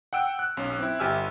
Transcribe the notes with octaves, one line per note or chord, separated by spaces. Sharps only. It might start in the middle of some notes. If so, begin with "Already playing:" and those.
F#5 G5 E6 D7
F#6
B1 C#4
C4 E4
G1 G4 E5 G#5 E6 F6